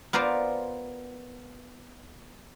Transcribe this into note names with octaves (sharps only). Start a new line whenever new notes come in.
B3 F4 A#4 C5 D5 F5